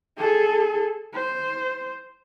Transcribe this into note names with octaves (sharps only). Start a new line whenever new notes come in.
G#4 A4
C5